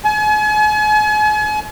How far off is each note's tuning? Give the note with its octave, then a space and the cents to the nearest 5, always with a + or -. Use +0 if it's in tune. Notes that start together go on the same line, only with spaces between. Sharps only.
G#5 +40